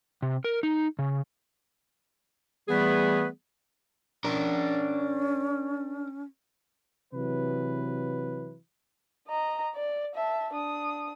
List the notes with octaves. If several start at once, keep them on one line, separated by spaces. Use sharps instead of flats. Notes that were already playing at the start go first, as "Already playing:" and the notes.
C3
A#4
D#4
C#3
E3 G3 A3 B3 G#4 B4
C#4 D4 A#4
C3 E3 F#3 B4
D#5 A#5
D5
E5 A5
D4 D#6